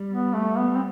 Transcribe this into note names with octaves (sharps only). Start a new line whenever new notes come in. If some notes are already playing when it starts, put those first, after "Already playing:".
Already playing: G3
B3
A3
B3
C4